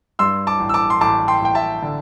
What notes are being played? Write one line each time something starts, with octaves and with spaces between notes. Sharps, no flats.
G2 C6 E6
A5 D6
A1
E6
A5 D6
C6
A1 A5 D6
G5 C6
A1 G5
E5 A5
D3